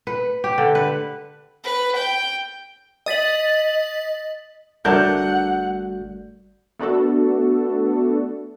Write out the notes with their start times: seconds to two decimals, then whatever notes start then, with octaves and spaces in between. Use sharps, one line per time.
0.07 B4
0.44 G4
0.58 D3
0.75 B4
1.64 B4
1.97 G5
3.06 D#5 A6 B6 F#7
4.85 G1 G3 A3 D4 F#4 A#4 F#5 G6
6.79 A3 B3 D4 F#4 A4